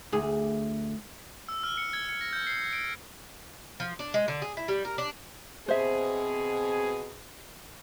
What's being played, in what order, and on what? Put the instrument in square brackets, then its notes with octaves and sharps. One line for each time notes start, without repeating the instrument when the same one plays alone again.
[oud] D2 G#4
[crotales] E6
F6
C#7
G#6
C#7
A#6
G6
C7
D7
[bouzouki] F3
D4
G#3
D3
G#4
E4
G3
A#4
D4
[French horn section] B2 C4 G#4 [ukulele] C5 E5